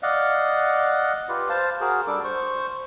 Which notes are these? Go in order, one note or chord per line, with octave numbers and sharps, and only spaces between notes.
D5 D#5 F5 F#5
F4 G4 B4
C5 F5 A5
F#4 G#4 A#4
G3 D4 A4 D6
C5 C#6